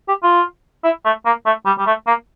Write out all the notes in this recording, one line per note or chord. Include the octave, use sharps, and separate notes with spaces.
G4
F4
E4
A3
A#3
A3
G3
G3
A3
A#3